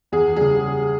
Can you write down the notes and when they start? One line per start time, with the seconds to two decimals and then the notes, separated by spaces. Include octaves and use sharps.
0.12 E2 G#4
0.36 C#3 G3 G#4